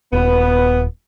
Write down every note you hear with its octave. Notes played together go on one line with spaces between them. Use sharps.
D#1 B3